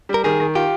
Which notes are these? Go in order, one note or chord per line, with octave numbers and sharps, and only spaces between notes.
G3
A#4
D#3 G#4
D#3
F4 G4